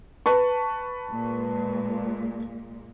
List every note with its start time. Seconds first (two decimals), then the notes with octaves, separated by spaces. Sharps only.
0.26 B4 A5 C#6
1.11 A#2 G#3